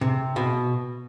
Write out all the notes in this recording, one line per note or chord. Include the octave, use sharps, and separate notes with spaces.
C3
B2